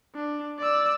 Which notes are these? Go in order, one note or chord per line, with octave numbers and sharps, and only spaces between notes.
D4
D5 E6